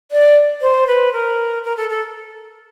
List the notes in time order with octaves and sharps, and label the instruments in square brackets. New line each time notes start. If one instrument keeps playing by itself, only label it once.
[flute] D5
C5
B4
A#4
A#4
A4
A4